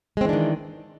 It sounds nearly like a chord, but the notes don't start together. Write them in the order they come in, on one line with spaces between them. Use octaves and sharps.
G#3 C4 E3 D4 D#3